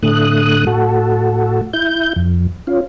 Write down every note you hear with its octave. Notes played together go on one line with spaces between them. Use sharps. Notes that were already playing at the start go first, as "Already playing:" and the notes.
A2 D3 A3 D#6 F#6
A2 F#4 A4
E4 G6
F2
C#4 F4